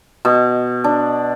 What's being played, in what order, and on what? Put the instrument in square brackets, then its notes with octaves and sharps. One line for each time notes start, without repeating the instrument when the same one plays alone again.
[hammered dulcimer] B2
D4